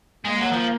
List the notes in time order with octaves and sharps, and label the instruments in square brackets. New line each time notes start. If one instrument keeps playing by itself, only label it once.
[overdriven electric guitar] G#3 [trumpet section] A#3
[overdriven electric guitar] F#3
F3